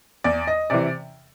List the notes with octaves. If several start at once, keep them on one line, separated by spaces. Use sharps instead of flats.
E2 D5
D#5
C3 E3 D5